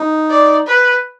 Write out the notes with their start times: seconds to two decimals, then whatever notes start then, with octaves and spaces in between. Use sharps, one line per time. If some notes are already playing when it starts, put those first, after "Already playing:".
Already playing: D#4
0.30 D5
0.67 B4